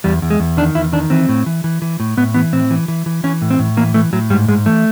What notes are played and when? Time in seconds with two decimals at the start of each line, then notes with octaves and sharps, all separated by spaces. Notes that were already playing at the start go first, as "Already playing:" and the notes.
0.04 E2 G3
0.22 E2
0.30 G#3
0.40 E2
0.57 D#3 D4
0.75 E2 E4
0.93 D#3 D4
1.10 E3 C4
1.29 A2
1.46 E3
1.64 E3
1.82 E3
2.00 A2
2.17 A2 B3
2.34 E3 B3
2.53 A2 C4
2.71 E3
2.88 E3
3.06 E3
3.24 E3 C#4
3.42 A2
3.50 C4
3.59 A2
3.77 E3 A#3
3.94 E3 A3
4.13 A2 F#3
4.30 G#2 G3
4.48 G#2 G#3
4.66 E3 A3